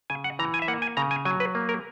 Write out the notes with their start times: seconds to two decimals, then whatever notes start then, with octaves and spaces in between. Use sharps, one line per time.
0.10 C#3 G#5
0.24 F#5
0.39 E3 A#5
0.54 G#5
0.62 E5
0.68 A#3 F#5
0.82 G#5
0.97 C#3 A#5
1.11 G#5
1.25 F#3 G#5
1.40 B4
1.55 A#3
1.69 A#4